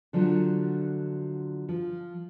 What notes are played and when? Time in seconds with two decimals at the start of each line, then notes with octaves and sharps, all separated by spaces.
0.13 D3 F3 F#3 A3
1.69 F3